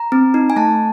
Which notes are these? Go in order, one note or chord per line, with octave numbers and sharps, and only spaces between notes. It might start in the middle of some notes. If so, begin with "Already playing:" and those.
Already playing: A#5
C4
D#4
G#5
A3 A5